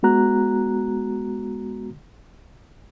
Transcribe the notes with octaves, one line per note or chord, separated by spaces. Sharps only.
G#3 B3 F#4 A#5 F#6